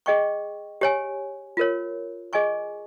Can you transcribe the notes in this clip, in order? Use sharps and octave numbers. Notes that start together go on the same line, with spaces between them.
G#4 D#5 G5 C#6
G4 C#5 G#5
F4 A#4 C#5
G#4 D#5 G#5 C#6